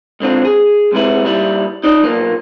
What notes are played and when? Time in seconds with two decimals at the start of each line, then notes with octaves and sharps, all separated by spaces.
0.20 G#2 D3 C4 F4
0.45 G#4
0.92 G#2 C3 G#3 B3 E4
1.24 A#2 G3 E4
1.84 D#4 D5 D#5
2.03 B1 A#2 A#3